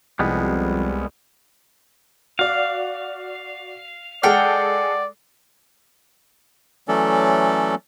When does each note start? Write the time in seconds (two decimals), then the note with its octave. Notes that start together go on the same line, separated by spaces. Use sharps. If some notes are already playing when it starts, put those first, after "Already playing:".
0.19 C2 F2 G3 G#3 B3
2.39 F#4 D5 F5
4.23 G#3 G#4 A4 D5 F#5 G5 F6
6.88 E3 F#3 A3 C#4 A4 D5